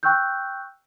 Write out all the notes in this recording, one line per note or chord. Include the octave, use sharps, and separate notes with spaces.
G5 C#6 E6 F#6 G6